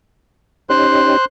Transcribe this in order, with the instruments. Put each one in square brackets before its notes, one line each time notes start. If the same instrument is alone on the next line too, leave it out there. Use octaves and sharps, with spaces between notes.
[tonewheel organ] C#4 D#4 G4 [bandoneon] C5 C6 F#6